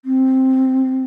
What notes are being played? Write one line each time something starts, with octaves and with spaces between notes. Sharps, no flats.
C4